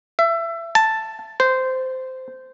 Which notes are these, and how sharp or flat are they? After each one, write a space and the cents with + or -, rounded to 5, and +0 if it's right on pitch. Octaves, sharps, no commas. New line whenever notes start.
E5 +25
A5 +5
C5 -15